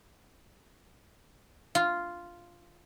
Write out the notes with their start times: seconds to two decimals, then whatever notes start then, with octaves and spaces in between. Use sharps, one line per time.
1.75 F4